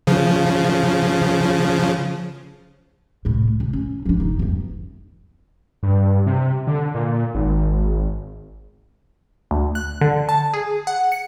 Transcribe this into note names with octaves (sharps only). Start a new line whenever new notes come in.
C#3 F3
C2 A2
C2
C#4
F3 D4
F1 D#4
E2 G2
G2
C3
D3
A#2
G#1
D2
F#6
D3
A5
G#4
F#5
C#7